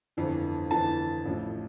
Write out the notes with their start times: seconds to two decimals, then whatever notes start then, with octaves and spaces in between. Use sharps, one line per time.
0.17 G1 F2 E3
0.71 G1 F2 E3 A5
1.25 A1 A2 F3